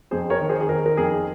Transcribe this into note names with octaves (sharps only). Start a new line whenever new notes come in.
F2 G#4 C5
A#4 C#5
D#3
G#4 C5
G#4
D#3 A#4
A#4
F2 G#4